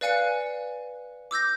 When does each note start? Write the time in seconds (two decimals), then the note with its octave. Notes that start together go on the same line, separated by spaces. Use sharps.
0.01 B4 D5 F5 G#5 F#6 C#7
1.31 D6 E6 G6 A#6